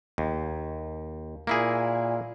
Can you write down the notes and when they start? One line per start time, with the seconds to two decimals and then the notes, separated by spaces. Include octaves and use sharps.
0.18 D#2
1.47 A#2 A#3 E4 G#4